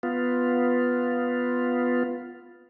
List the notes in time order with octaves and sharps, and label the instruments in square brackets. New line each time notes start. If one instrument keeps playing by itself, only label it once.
[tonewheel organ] B3 F4